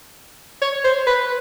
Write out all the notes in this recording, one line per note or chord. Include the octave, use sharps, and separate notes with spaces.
C#5
C5
B4